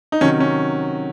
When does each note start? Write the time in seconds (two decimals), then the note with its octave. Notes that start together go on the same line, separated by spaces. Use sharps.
0.12 D#4
0.21 C3 D#3 F#3 C#4
0.40 C#4